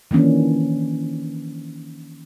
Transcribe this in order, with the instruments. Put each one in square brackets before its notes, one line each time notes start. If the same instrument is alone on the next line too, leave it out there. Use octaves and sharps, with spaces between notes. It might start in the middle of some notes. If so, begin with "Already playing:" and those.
[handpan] D#3 E3 A#3 C#4 D4